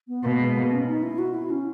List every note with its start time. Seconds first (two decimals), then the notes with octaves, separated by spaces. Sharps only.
0.08 B3
0.24 B2 A#3
0.40 G#3
0.56 A#3
0.71 C#4
0.87 D#4
1.03 E4
1.19 F#4
1.35 E4
1.50 C#4